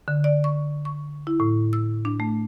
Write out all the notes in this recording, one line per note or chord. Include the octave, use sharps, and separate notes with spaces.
D3
D5
C#6
C#6
E4
A2
E6
D4
A3